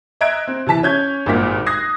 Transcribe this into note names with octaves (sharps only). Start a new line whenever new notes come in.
D#5 E5 A#5 F#6 G#6 D7
C4
C3 E3 A5 B6
C#4 G6 G#6
G#1 G2 A#2 A#3 A#4 B6
D#6 F#6 G#6 A#6 C7